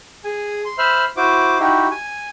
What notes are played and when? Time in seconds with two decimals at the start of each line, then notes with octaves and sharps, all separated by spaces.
0.24 G#4 G#5
0.65 C6
0.78 C5 E5 B5 F6
1.17 E4 F#4 C5 D6
1.59 D#4 E4 F#4 G4
1.91 G#5